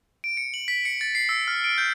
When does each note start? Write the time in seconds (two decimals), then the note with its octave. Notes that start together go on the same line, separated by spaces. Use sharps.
0.24 D7
0.37 C#7
0.54 F#7
0.68 B6
0.85 C#7
1.01 A6
1.15 C7
1.29 E6
1.48 F6
1.64 D7
1.78 G6